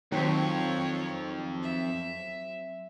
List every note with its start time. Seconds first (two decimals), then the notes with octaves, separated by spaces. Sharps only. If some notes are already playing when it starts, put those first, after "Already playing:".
0.12 F2 D#3 F#3 C4 C#5
1.63 E5